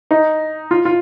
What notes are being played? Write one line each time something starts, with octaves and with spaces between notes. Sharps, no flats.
D#4
F4
F4